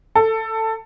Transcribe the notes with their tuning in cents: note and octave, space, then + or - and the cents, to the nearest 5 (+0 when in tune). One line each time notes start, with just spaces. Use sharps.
A4 +15